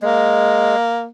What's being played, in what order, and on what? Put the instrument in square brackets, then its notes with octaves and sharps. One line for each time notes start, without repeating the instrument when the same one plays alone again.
[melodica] G#3 [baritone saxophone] A#3